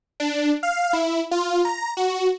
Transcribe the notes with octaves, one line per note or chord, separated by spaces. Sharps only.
D4
F5
E4
F4
A#5
F#4